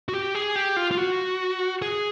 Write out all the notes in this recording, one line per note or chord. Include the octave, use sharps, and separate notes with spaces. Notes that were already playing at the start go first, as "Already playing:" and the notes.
F#4
G4
G#4
G4
F4
F4
F#4
G#4